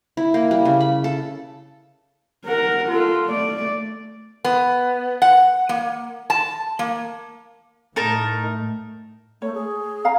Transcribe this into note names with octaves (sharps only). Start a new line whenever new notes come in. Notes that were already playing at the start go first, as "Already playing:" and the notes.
E4
A#3
G3
C#3
B5
A4
A#4 F#5
F4 A4
A3 D5
B3
F#5
A#3
A5
A#3
A2 A3 D#4 A#4 A5
A3 C#5
G#4
F5 A#5